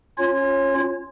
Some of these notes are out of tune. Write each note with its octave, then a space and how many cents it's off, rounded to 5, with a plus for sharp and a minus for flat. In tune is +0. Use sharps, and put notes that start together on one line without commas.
C#4 +0 F4 +0 C#5 -25